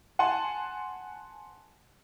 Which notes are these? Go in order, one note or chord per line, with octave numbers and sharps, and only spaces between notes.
F#5 G#5 A5 C6